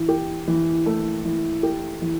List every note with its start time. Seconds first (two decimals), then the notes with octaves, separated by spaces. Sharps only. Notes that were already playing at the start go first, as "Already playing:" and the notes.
Already playing: E3
0.08 G4
0.48 E3
0.86 A3
1.25 E3
1.63 G4
2.02 E3